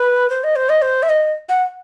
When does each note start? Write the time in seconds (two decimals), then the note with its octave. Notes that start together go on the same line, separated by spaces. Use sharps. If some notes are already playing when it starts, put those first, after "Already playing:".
Already playing: B4
0.30 C5
0.44 D#5
0.56 C5
0.69 D#5
0.82 C5
1.03 E5
1.09 D#5
1.49 F#5